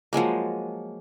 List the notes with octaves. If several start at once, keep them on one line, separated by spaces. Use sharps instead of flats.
F3 F#3 G#3 A#3